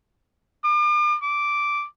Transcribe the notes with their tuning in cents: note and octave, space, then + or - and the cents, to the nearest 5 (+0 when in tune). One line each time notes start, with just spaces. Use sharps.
D6 +40
D6 -5